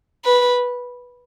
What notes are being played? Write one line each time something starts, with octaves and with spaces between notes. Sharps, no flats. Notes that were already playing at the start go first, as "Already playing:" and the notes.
B4